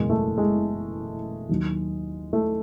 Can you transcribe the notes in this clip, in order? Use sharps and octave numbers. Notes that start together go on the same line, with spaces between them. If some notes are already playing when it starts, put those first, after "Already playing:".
Already playing: F#1 E2 B2 G#3 A#3
A3
G#3
D#2 D#3 F#3
A3